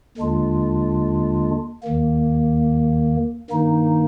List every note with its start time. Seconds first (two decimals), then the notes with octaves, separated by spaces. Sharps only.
0.18 D#2 D3 G#3 D4 F4
1.83 D#2 D#3 A#3
3.50 G2 D#3 A#3 D#4